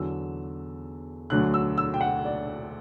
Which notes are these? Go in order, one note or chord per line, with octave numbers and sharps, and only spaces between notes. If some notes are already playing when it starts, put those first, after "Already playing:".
Already playing: E2 D3 F#3 E6
D2 D3 F#3 F#6
E6
E6
G5
F#5
D5